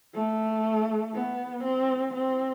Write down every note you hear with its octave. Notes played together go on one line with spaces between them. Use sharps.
A3
B3
C4
C4